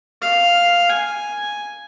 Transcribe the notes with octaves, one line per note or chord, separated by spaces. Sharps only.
F5
G#5